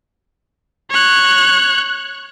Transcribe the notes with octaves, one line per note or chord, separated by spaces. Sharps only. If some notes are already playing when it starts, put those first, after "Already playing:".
C#5 F#6